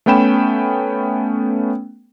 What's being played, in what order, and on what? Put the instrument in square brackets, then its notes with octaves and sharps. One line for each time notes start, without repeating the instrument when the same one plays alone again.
[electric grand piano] A3 B3 C#4 G5 B5 E7